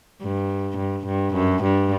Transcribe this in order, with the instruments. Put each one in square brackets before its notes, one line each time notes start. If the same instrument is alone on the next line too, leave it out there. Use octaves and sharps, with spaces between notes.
[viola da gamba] G2
G2
G2
F#2
G2